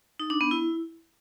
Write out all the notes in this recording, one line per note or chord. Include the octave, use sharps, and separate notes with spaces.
D#4
D4
B3
E4